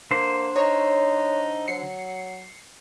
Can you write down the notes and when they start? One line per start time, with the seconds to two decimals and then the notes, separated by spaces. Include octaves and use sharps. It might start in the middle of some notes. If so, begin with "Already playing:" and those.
0.11 D3 A#3 C5
0.56 D#4 C#5
1.68 F#3 C7 C#7